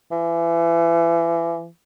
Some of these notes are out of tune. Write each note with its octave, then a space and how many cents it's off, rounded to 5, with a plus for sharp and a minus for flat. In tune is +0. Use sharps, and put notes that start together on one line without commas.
E3 +30